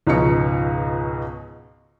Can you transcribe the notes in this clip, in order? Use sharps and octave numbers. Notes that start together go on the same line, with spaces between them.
C#2 G#2 B2 F3 C#4 C#7